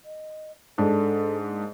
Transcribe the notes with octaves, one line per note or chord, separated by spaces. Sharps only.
D#5
G#2 D4 A4
A#3